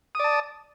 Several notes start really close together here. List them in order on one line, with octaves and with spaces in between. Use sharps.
D#6 D5 A5